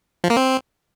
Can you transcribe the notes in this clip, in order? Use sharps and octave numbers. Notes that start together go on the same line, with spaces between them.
F3
A#3
C4